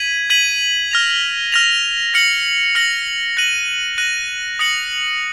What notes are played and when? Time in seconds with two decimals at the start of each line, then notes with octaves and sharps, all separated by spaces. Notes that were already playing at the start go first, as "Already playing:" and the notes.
Already playing: G#6 B6 D#7 F#7
0.30 G#6 B6 D#7 F#7
0.91 F6 A#6 F7
1.52 F6 A#6 F7
2.14 F6 A#6 C#7 F#7
2.75 F6 A#6 C#7 F#7
3.37 F#6 A#6 D#7 F#7
3.98 F#6 A#6 D#7 F#7
4.59 D#6 A#6 C#7 F#7